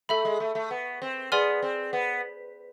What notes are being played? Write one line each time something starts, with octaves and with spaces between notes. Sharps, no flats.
A3 A4 E5 B5
G#3
A3
A3
B3
C4
B3 G#4 D5 G#5 C6 F6
C4
B3